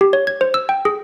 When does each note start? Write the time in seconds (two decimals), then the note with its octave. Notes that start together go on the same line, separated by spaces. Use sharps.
0.01 G4
0.13 C#5
0.27 G#6
0.41 C5
0.54 E6
0.69 G5
0.85 G#4